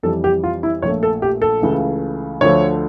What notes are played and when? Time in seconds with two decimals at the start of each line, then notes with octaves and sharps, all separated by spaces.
0.03 F2 E3 G3 A4
0.24 G4
0.44 F4
0.63 E4
0.82 A#1 A#2 A3 C#5
1.03 A4
1.22 G4
1.42 A4
1.62 C#2 C#3 E3 A3
2.41 D2 D3 F3 A3 C#5